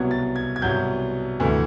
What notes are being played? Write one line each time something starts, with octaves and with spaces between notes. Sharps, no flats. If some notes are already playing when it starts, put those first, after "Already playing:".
Already playing: C2 B2 F#3 B3 G#6
A6
G#6
G#6
C2 B2 F#3 B3 G6
D2 C3 E3 A3